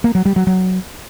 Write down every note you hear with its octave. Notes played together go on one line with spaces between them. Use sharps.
A#3
F#3
G3
F#3
F#3